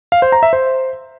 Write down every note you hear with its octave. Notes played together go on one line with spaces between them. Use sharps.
F5
C5
A#5
E5
C5